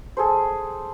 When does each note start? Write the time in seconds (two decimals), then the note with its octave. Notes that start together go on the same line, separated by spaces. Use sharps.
0.17 G#4 A4 C5